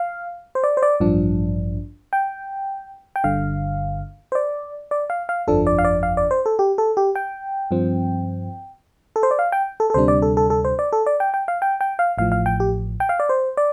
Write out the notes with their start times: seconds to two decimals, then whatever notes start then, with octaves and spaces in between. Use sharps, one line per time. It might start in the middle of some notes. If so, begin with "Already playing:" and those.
Already playing: F5
0.55 C5
0.64 D5
0.77 C5
0.83 D5
1.00 A1 G2 F3 D4
2.13 G5
3.16 G5
3.24 G1 G2 D3 F5
4.32 C5
4.35 D5
4.91 D5
5.10 F5
5.29 F5
5.48 G1 F2 F3 D4 A4
5.67 D5
5.79 F5
5.85 D5
6.03 F5
6.17 D5
6.31 C5
6.46 A4
6.59 G4
6.78 A4
6.97 G4
7.15 G5
7.71 G2 F3 C4
9.16 A4
9.23 C5
9.31 D5
9.39 F5
9.52 G5
9.80 A4
9.90 A4
9.94 D2 C3 G3 D4 C5
10.08 D5
10.22 A4
10.37 A4
10.50 A4
10.65 C5
10.79 D5
10.93 A4
11.06 D5
11.20 G5
11.34 G5
11.48 F5
11.62 G5
11.81 G5
11.99 F5
12.18 A1 A2 F3 F5
12.32 F5
12.46 G5
12.60 G4
13.00 G5
13.09 F5
13.20 D5
13.29 C5
13.57 D5